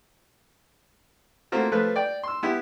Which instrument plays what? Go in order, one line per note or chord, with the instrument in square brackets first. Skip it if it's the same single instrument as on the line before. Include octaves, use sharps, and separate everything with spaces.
[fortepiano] A3 A#3 C4 F4 F#4
F3 A3 B4
D5 G5
C6 E6
B3 E4 G4